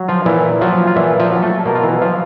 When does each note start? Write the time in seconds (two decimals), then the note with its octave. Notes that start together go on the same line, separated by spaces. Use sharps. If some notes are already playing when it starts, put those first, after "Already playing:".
Already playing: F#3
0.08 F3 F4
0.25 A#2 E3 E4
0.61 F3 F#3 F4
0.87 F4
0.96 A#2 E3 E4
1.19 F3 F4
1.31 F#3
1.43 A3 A4
1.66 B2 A#3 A#4
1.75 F4
1.83 E3 E4
2.01 F3 F#3 F4